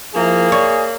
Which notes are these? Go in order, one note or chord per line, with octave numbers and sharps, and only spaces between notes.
F3 A#3 E4 G#4
C#5 D5